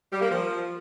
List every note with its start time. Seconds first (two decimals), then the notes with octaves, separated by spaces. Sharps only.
0.12 G3
0.21 A#3
0.30 F3